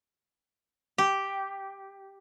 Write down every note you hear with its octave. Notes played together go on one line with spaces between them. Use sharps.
G4